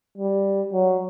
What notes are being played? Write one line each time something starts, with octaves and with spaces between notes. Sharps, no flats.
G3
F#3